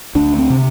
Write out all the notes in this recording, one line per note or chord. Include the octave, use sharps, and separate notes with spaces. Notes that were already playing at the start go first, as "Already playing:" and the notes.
D2 D4
C4
C3